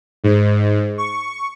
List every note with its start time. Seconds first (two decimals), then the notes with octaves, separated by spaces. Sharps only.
0.24 G#2
0.98 C#6